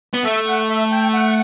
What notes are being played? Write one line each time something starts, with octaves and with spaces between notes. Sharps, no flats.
B3
A3 E5
F#5
E5
G5
F#5